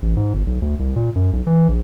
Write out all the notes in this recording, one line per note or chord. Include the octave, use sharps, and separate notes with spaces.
A1
G#2
G1
B1
D2
C2
A#2
F#2
B1
E3
A#1